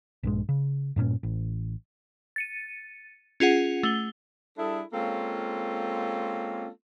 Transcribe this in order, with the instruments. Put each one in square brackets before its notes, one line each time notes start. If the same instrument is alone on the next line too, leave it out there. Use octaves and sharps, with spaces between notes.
[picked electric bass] A#1 G2 G#3
C#3
G2 A#2 A#3 C#4
A1
[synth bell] A6 C#7 D#7
C#4 F4 G#4 F#5
A3 G7
[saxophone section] G3 D4 E4 G#4 A4
G#3 A#3 C4 C#4 F4 A4